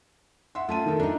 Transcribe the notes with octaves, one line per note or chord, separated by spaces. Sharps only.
E5 F#5 C6
A3 C#4 F4 A5 D#7
D#3 A4
D4 D#4 A#5